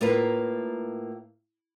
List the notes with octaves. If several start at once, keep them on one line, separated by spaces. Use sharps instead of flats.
A2 A#3 F4 A#4 B4